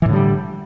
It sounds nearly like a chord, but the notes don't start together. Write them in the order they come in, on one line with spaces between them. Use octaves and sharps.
E3 A2 D3 G3